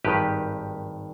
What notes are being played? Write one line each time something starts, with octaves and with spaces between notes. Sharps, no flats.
G#1 G2 D#3 G4 B4